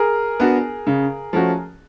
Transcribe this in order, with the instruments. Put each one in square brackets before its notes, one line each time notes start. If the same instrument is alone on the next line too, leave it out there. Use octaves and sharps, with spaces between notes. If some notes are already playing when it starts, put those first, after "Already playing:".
Already playing: [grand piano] G#4 A#4
[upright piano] B3 D4 F#4
C#3
F3 A3 C#4 F#4